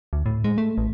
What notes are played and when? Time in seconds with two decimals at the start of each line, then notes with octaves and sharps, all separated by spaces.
0.13 D2
0.26 A2
0.44 G#3
0.58 A3
0.78 A1